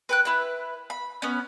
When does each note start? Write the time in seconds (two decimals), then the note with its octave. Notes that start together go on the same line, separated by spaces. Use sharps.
0.09 B4 G5 F#6
0.25 E4 B4
0.90 B5
1.22 B3 C#4